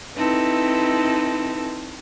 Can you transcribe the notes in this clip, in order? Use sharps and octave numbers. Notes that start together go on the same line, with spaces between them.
C4 D#4 E4 A4 B4